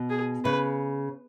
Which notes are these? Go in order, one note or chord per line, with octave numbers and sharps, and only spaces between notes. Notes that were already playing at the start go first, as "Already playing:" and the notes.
Already playing: B2
G#4
C#3 B4